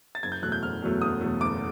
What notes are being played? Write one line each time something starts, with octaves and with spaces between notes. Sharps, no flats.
A6
F#1 G#6
G6
E2 B2 F#3 A3 F#6
G6
F#1 F6
E2 B2 F#3 A3
F#1 D#6
E2 B2 F#3 A3
F#1 D6